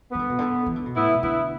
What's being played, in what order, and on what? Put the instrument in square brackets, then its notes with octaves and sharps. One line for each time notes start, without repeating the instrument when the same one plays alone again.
[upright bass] E3 [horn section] B3
[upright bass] D3
B2
D3
E3
D3
B2
[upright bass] A2 [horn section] B3 E4
[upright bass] B2
[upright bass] D3 [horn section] B3 E4